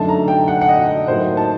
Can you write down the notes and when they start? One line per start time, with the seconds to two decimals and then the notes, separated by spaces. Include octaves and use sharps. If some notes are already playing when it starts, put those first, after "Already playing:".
Already playing: F#2 D3 A3 D#4 A5
0.09 A#5
0.28 G5
0.48 F#5
0.61 F#5
0.69 D#5
1.08 A2 F#3 A#3 D#4 C5
1.37 A5